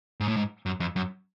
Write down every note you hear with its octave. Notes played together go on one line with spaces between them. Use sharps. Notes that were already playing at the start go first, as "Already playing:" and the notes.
G#2
A2
G#2
F#2
F2
F#2